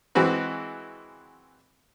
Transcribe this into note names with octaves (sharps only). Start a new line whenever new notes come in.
E3 G#3 C4 F#4 B4